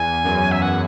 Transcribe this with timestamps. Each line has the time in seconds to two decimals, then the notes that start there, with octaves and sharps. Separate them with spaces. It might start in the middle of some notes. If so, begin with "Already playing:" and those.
Already playing: E2 G#5
0.24 F#2
0.51 E5
0.62 F#5